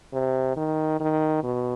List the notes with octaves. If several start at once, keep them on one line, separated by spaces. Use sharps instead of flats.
C3
D#3
D#3
B2